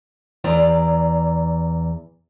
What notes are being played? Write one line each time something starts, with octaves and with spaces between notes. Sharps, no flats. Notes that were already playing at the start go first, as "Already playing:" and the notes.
E2 D5 A#5